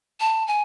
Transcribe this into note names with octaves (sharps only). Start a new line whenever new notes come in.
A5
G#5